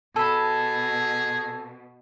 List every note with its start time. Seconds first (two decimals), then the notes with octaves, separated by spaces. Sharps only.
0.16 B2 G#4 A4 A5 B5